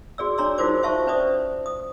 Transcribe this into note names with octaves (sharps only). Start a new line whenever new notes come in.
F#4 G#4 D5 E6
D4 C#5 D5 A#5 C6 E6
D#4 F4 F#4 A#4 C5 D6
C5 E5 F5 A5 C#6
C#4 B4 C5 D5 D#6
D#6